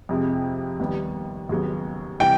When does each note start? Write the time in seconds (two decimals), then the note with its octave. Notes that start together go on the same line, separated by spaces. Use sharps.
0.09 F2 C3 F3 G#3 C4
0.80 D#2 D#3 G3 B3
1.49 D#2 C#3 F#3 B3
2.20 C3 E3 G3 G5